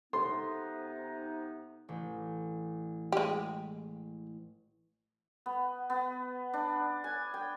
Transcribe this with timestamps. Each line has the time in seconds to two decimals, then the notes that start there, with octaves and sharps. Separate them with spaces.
0.13 C3 B3 D#4 A4 C6
1.89 A1
3.12 G#3 G4
5.46 B3
5.90 B3
6.53 D4
7.04 G#5
7.34 G5